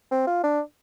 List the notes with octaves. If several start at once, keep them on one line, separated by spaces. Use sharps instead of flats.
C4
F4
D4